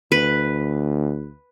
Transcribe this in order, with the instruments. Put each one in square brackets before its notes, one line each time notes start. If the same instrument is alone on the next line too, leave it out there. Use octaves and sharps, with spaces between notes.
[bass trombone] D2 [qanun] B4